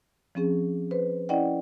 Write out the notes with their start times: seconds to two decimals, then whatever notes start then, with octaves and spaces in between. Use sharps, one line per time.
0.35 F3 C4 C#4 G#4
0.91 B4 C5
1.29 C#4 E4 D5 D#5 F#5 G5